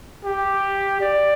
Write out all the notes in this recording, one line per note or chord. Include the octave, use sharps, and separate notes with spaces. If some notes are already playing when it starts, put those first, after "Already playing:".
G4
D5